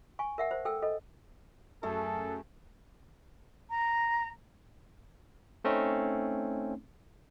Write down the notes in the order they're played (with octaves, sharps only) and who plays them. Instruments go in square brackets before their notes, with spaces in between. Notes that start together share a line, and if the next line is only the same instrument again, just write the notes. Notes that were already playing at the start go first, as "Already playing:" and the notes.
[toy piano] G#5 C#6
A#4 E5 F#5
C5
A4 G5 E6
A4 D#5
[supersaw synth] F#2 [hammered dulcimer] A3 G#4 [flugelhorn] A4
[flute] A#5
[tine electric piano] A3 C4 C#4 D#4